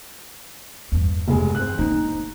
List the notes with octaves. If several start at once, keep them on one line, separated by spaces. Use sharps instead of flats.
E2 G2
F1 G#3
C4 F#6
A#3 D4 D#4